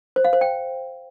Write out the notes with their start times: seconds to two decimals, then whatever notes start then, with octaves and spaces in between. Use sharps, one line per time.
0.16 C5
0.25 F5
0.33 C5
0.41 G5